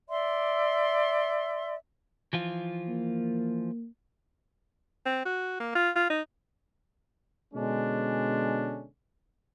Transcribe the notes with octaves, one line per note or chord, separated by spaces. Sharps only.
D5 E5 C6
E3 F3 F4
A#3
C4
F#4
A#3
F4
F4
D#4
B2 D3 G#3 C#4 D4